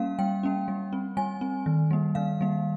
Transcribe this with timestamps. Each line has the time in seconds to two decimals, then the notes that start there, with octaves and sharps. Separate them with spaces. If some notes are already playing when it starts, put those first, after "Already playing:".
Already playing: G3 A#3 C#4 F5
0.19 G3 G5
0.43 A#3 C#4
0.68 G3
0.93 C4
1.17 G3 G#5
1.41 C4
1.66 D#3
1.91 G3 A#3
2.15 D#3 F5
2.41 G3 A#3